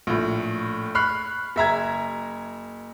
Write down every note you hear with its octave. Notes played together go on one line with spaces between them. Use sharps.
A#1 A2
B5 C#6 F6 F#6 C7
F#1 E5 A#5 G#6